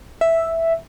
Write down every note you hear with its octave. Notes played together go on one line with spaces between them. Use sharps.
E5